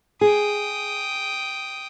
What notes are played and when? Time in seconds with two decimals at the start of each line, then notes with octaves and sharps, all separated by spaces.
0.21 G#4 G5 D#6